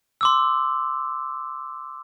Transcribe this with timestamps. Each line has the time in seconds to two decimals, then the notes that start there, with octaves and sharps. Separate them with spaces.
0.21 C6 D6 E6